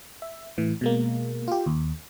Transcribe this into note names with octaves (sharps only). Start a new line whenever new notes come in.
E5
A2 E3
B2 G#3 A#3
F4 G4
D#2